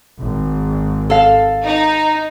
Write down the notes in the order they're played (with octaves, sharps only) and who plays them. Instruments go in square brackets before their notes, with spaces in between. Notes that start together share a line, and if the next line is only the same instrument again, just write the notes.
[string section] G#1
[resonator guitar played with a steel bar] A4 F5
[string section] D#4